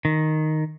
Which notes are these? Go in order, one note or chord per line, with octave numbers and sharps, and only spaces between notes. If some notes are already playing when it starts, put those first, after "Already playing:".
D#3